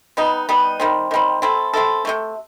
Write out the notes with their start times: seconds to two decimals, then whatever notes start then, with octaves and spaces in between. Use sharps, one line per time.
0.17 G3 B3 D#4
0.49 G3 B3 D#4
0.80 D#3 G3 C4
1.11 D#3 G3 C4
1.42 C4 E4 A4
1.74 C4 E4 A4
2.05 C3 F#3 A3